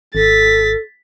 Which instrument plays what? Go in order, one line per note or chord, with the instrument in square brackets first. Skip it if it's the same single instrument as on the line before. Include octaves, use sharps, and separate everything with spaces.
[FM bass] G#1 [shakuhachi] A4 [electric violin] A6 B6